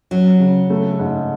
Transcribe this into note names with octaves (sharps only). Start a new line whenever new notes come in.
F#3 C#4
C#3
A3
G#2